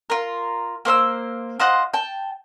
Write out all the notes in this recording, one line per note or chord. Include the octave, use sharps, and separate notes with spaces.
F4 A#4
A#3 C5 E5 E6
F4 C5 D#5 F#5
G5 A5